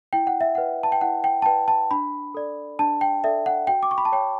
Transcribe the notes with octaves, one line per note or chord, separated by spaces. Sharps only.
E4 G5
F#5
E5
B4 D5 F#5
A5
G5
E4 F#5
G5
A5
B4 D5 G5
A5
D4 B5
A4 D5
D4 A5
G5
A4 D5 E5
F#5
F#4 G5
D6
C#6
B5
A5
C#5 G5